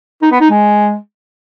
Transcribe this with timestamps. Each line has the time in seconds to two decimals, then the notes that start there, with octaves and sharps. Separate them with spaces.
0.22 D#4
0.31 B3
0.41 D#4
0.50 G#3